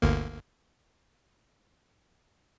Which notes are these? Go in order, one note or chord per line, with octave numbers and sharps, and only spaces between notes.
G1 D2 A#3